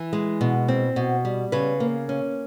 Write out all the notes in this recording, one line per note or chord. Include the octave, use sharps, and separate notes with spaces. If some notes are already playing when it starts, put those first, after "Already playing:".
Already playing: E3
G#3
B2
C4
B2
G3
C#3 B4
A#3
C#4